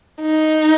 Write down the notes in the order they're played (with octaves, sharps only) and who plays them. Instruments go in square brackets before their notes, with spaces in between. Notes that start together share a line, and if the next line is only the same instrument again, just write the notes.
[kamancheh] D#4